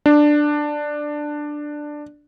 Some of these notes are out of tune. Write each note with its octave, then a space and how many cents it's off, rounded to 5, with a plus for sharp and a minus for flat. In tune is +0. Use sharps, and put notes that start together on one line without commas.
D4 +10